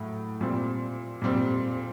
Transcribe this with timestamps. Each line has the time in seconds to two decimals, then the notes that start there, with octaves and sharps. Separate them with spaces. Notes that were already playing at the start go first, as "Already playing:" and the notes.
Already playing: A2 F#3 A3
0.41 A#2 G3 C4
1.21 A#2 G3 C4